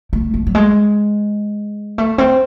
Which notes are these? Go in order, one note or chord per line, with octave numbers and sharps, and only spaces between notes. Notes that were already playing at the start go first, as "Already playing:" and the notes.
A3
A3
F#3
G#3
A3
C4